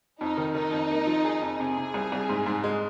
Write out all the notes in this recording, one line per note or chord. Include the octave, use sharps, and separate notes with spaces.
F2 D#4
D#3
D#3 D#4
F2
A#3
F3
G#4
F2
C3 G#4
C3
C2
C2
G#2
G#2
G#3